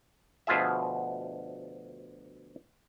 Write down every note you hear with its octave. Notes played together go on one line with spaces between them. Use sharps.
D2 B2 F3 F4 G#4 E5